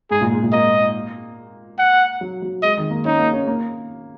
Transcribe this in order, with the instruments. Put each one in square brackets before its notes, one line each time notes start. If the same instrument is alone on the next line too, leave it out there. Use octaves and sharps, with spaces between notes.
[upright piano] G#2 [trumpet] G#4
[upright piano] A#2
G#2
A#2
[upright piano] A#3 [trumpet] D#5
[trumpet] F#5
[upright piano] F#3
F#3
[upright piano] G#3 [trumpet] D#5
[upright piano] D#3
A#3
[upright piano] C#4 [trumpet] D#4
[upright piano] A#3
C#4
A#3